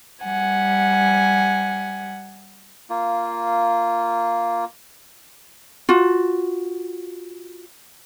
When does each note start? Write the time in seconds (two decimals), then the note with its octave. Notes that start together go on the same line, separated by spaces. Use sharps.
0.24 G3 F#5 G#5
2.90 A#3 F4
5.89 F4 F#4